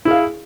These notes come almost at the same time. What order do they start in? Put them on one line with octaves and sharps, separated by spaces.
E4 G#4 F5